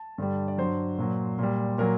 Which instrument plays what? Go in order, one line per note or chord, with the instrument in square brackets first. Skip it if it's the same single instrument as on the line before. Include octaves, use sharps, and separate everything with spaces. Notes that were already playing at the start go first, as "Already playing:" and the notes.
Already playing: [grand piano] A5
G2 D3 G3
D5
G2 F#3 C5
A#2 F#3
A#2 G3
A#2 F#3 A#4